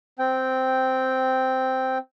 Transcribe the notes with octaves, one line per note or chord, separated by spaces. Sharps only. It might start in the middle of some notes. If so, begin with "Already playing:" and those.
C4 G5